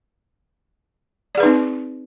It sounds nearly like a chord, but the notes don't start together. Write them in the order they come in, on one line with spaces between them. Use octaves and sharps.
D5 G#4 B4 D#4 C4